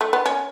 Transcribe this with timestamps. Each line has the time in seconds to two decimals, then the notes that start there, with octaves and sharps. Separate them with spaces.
0.01 A3
0.13 B3
0.26 C#4